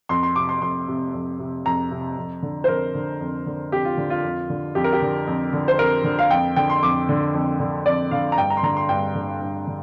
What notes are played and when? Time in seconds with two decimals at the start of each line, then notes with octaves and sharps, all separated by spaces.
0.09 F2 C6
0.23 C6
0.36 C3 D6
0.49 C6
0.61 F2 C6
0.88 C3
1.14 F2
1.39 C3
1.65 F2 A#5
1.91 C3
2.17 F2
2.43 D3
2.64 C5
2.68 F2 A#4
2.95 D3
3.21 F2
3.46 D3
3.72 F2 G4
3.85 F4
3.97 D3
4.10 F4
4.23 F2
4.50 D3
4.75 F2 G4
4.84 A#4
4.93 G4
5.02 D3
5.27 F2
5.53 D3
5.68 C5
5.79 F2 A#4
6.04 D3
6.19 F5
6.31 F2 G5
6.56 D3 G5
6.70 C6
6.83 F2 D6
7.09 D3
7.34 F2
7.60 D3
7.86 F2 D5
8.11 D3 F5
8.32 A#5
8.37 G2 G5
8.50 A#5
8.57 C6
8.63 D3 A#5
8.77 C6
8.89 G2 G5
9.15 D3
9.41 G2
9.67 D3